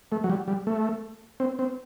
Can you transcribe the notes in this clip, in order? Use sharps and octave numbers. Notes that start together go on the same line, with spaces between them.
A3
F#3
G3
G3
A3
C4
C4